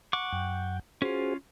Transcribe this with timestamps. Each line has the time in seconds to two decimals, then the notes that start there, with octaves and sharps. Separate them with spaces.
0.13 F#5 C#6 D6
0.33 F#2 G5
1.02 C#4 F4 F#4 G#4 C5